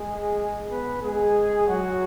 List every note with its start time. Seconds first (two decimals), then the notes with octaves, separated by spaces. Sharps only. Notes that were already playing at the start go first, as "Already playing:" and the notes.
Already playing: G#3 G#4
0.70 B3 B4
1.03 G#3 G#4
1.68 F#3 F#4